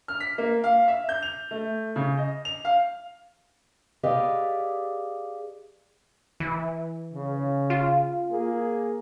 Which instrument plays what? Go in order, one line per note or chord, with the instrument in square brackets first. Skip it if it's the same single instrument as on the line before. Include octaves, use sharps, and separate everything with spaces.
[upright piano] F6
B6
A#3
F5
E5
G6
F7
A3
C#3
D#5
F7
F5
[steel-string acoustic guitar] G4 G#4 B4 D5 D#5 F5
[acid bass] E3
[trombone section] C#3
[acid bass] F4
[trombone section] A#3 G#4